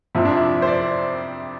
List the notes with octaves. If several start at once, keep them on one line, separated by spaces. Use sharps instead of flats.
F2 C3 F3 E4
D4
E4
C5
D5